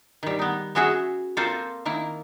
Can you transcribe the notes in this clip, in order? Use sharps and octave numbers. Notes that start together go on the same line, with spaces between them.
D#3 G3
B3 D#4
B3 C#4 F#4 G#4 E5
A#3 C4 F4 A4 C5
D#3 A#3 E4